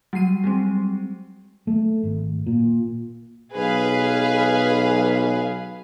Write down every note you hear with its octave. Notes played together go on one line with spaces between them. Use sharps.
F#3 G3 C7 D#7
G3 G#3 C4
A3
G#1
A#2
B1 G#4 B4 F5